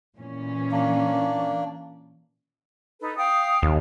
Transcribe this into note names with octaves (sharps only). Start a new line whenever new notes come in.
A#2 E3 C#4
A#3 D4
D#4 A4 B4
F5 G5 D#6
D#2